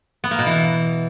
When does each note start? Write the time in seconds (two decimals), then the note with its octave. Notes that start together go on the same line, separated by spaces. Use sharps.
0.24 B3
0.31 A#3
0.39 B2
0.46 E3